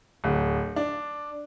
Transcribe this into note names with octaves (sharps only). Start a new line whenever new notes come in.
D1
D4